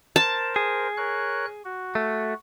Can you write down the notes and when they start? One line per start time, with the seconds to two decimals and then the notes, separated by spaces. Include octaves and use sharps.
0.16 A#4 C5 A5
0.56 G#4
0.97 A#4 C#5 F#6
1.65 F#4
1.95 A3